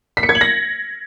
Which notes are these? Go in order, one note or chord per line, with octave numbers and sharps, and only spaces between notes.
B6
C#7
G#6
F#7
A#6